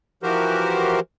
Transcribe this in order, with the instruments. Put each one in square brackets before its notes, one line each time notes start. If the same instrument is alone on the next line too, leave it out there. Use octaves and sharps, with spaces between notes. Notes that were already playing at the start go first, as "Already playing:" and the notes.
[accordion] E3 F3 F#4 G4 A#4 C5